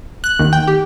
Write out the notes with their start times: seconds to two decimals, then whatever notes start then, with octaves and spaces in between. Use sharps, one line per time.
0.24 F#6
0.40 D#2
0.53 G5
0.67 G4